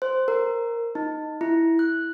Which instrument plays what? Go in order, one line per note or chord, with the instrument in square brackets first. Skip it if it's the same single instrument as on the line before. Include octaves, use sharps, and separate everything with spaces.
[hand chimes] C5
A#4
D#4
E4
F#6